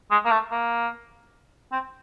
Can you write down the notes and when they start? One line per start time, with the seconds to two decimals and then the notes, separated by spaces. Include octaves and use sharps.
0.11 G#3
0.25 A#3
0.31 A3
0.51 A#3
1.72 C4